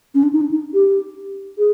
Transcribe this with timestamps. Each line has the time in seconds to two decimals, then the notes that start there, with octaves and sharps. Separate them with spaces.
0.14 C#4
0.23 D4
0.33 D#4
0.41 D4
0.51 D#4
0.74 G4
1.58 G#4